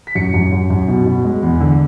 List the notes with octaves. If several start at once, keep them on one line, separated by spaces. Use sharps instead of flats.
B6
F#2 C#7
F#2
F#2
F#2
B2
B2
G#3
E2
D3